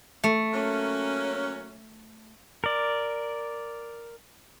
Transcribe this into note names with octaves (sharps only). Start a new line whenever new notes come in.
A3
F#3 A#3 C#4
A#4 D5